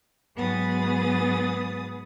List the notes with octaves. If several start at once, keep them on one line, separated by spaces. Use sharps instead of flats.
G#2 F#3 B3 G#4 D#6 A6